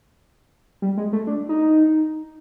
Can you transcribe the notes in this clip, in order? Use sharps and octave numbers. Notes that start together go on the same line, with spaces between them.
G3
G#3
A3
D4
D#4